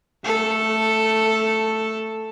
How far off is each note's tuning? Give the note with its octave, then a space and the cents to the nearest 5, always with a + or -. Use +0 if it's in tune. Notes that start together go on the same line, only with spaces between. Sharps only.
A3 +0 A4 +0